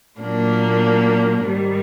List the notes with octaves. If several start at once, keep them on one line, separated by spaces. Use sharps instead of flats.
A#2 F#3 A#3 D4
G#2 D#3 G3